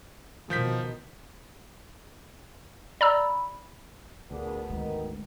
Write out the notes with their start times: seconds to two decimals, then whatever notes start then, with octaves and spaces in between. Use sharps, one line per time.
0.50 B2 D#3 F3 G6 B6
3.01 D5 A#5 B5 E6
4.31 D2 A#2 B3 D4 G#4
4.70 G#1 D#3 G#3